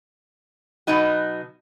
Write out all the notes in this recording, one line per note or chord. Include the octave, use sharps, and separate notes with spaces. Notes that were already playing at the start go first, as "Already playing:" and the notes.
B2 F#3 B3 D#4 F#4